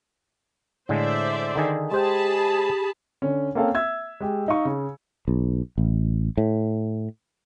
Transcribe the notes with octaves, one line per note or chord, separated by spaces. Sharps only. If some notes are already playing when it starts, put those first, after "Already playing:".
A2 D3 G#3 C5 D5 E5
D3 D#3 G#4
G#3 G4 G#4 C5 G5 A5 B5
D3 C#4
A#3 C4 C#4 A4 F5
E5 E6 G#6
G#3 G4
D#4 F5 C#6
C#3
B1
A1
A2